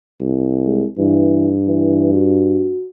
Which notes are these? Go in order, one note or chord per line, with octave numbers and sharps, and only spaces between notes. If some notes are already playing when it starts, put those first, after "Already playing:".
C2
G#3
G2 E3
E3
F#4